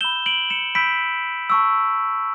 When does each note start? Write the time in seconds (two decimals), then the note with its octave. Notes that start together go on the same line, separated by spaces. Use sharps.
0.01 B5 E6 G6 E7 G7
0.26 D7 F#7
0.50 C#7 E7
0.75 B5 E6 G6 B6 D7
1.50 A5 C#6 E6